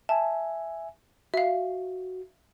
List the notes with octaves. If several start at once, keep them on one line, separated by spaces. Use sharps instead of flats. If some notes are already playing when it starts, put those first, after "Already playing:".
E5 G#5 A5
F#4 E5 F5